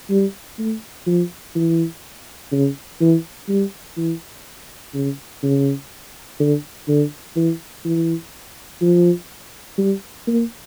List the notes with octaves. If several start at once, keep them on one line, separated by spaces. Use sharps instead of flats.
G3
A3
F3
E3
C#3
E3
G3
E3
C#3
C#3
D3
D3
E3
E3
F3
G3
A#3